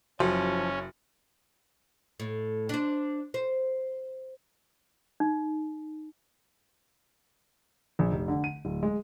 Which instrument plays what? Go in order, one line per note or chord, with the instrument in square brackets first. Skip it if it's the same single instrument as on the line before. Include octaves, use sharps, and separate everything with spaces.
[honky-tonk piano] F#1 [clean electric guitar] F3 [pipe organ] C#4 [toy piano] F#4 A4 G5
[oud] A2
D4 C5
C5
[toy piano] D#4
[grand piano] A#1
F1
D3
D#7
D1
G#3